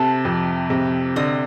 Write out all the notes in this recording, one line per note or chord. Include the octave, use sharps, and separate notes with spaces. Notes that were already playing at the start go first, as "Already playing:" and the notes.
Already playing: C3 A4 A5
F2
C3
D3 D#5 D#6